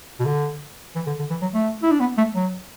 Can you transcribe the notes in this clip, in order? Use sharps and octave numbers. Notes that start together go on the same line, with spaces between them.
B2
D3
E3
D3
D3
E3
F#3
A3
E4
D4
B3
A3
F#3